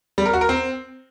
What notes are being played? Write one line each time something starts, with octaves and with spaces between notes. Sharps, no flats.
G3
A#4
F#4
A#4
C4